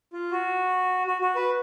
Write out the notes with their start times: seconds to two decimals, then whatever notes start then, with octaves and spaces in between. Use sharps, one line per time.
0.13 F4
0.31 F#4
1.07 F#4
1.21 F#4
1.35 B4